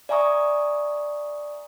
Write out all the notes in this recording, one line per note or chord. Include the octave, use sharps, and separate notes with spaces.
D5 E5 G#5 A#5 C#6 D#6